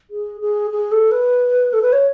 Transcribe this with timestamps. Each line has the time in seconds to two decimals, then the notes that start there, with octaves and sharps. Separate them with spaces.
0.11 G#4
0.41 G#4
0.71 G#4
0.92 A4
1.11 B4
1.73 A4
1.82 B4
1.93 C#5